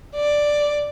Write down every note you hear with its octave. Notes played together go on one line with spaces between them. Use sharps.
D5